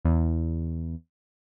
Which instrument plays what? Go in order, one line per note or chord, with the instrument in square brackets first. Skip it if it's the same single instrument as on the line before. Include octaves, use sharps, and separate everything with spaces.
[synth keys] E2